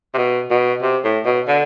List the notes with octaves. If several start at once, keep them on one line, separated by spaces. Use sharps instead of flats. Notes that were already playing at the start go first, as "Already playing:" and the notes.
C3
B2
B2
C3
A2
B2
D3